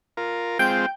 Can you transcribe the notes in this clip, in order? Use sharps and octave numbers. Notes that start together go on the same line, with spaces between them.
F4 A#4
G#3 C4 F4 G5 G6